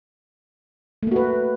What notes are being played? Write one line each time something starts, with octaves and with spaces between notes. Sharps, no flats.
A3 A#3 F#4 B4